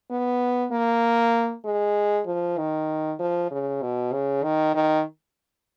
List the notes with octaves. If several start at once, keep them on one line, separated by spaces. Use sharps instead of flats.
B3
A#3
G#3
F3
D#3
F3
C#3
B2
C#3
D#3
D#3